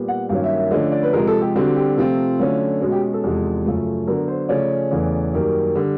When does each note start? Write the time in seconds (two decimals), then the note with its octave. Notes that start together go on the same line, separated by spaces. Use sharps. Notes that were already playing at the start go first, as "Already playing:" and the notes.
Already playing: A#2 G3 B3
0.08 F#5
0.29 G2 D#3 F#3 A#3 C#4 F5
0.44 E5
0.57 E5
0.71 D3 F3 A3 C#4 D#5
0.92 D5
1.03 B4
1.13 C3 F3 G#3 A#4
1.27 A4
1.42 G4
1.55 D3 G3 C4 F#4
1.76 G4
1.98 C3 F3 A3 C4 F4
2.40 D3 F#3 A3 C#4
2.81 B2 G#3 C#4 F#4
2.92 G4
3.13 A4
3.24 E2 C3 F3 G#3
3.66 F#2 C#3 F3 A3
4.07 D3 F#3 B3 A#4
4.28 C5
4.49 C#3 F3 A3 C#4 D5
4.91 E2 C#3 E3 A3 C#4
5.34 F#2 D#3 G3 A#3
5.75 D3 G3